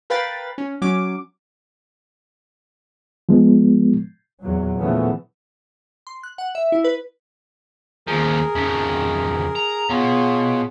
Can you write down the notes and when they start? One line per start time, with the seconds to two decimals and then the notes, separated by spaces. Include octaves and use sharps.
0.10 A#4 B4 F5 G5 B5 A6
0.58 C#4
0.82 F#3 C#4 D6
3.29 F3 G#3 B3
4.41 E2 A#2 F#3
4.77 A#2 C#3 E3 F3 A3 B3
6.07 C6
6.23 F#6
6.38 F#5
6.55 E5
6.72 E4
6.84 B4
8.07 D#2 F3 G#4 A#4
8.55 F2 C#3
9.55 A#5
9.90 B2 F4 G#4 C#5